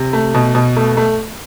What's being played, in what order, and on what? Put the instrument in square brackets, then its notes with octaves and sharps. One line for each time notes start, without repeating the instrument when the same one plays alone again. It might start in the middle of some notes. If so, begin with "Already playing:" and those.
Already playing: [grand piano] C3
A3
B2
B2
A3
A3